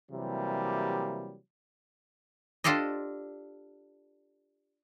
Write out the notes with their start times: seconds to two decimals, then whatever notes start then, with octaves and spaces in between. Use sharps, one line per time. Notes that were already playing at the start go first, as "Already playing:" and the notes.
0.12 C3 E3 F#3 G3 A#3
2.64 D4 F4 G4 A4 C5 D#5